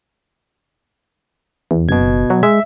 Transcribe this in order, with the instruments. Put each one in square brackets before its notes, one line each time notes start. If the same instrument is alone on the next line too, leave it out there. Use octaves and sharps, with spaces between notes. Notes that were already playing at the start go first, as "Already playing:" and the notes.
[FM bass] E2
[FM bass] F#1 [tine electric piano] B2 G#6
[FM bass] F#3
[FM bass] G#3 [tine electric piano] E5